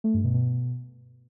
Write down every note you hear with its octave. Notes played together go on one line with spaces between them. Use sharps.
A3
G2
B2
B2